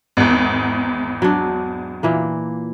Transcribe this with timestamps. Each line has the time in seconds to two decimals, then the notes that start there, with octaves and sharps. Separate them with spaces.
0.17 G#1 E2
1.22 F#3 D4
2.03 A#2 E3 A#3